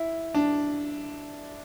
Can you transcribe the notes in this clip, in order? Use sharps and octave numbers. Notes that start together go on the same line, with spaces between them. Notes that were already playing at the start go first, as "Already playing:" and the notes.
Already playing: E4
D4